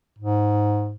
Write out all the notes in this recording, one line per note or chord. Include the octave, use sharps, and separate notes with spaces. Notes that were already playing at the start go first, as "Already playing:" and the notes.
G#2